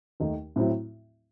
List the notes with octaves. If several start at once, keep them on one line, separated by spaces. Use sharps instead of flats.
D#2 D#3 A3 D#4
A2 F#3 C4 E4